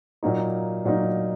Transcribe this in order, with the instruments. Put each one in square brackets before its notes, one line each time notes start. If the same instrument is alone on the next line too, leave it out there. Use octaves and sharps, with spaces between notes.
[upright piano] A#2 F#3 A#3 D#4
A#2 F#3 A#3 D#4